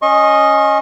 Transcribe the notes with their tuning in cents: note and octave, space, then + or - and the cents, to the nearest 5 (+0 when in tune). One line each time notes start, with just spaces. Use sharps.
C#4 +0 D#5 +0 C#6 -45